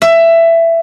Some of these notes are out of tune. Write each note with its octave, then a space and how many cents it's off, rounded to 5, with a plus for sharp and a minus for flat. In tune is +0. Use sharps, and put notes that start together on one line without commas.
E5 +15